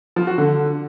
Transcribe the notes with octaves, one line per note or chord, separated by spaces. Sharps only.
F3
F#4
D3